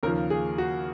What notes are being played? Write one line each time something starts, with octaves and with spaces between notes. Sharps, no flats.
D#2 C#3 F3 A#4
G#4
F#4